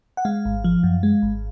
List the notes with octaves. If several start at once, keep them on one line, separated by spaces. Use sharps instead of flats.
F#5
G#3 F5
G#1
F3
F#2
G#3
G#1